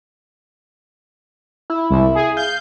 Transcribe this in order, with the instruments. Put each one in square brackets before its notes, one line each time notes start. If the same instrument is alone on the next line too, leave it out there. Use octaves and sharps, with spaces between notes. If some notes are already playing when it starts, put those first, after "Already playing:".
[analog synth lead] E4
[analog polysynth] C2
G#4
[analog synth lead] F5 [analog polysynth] G6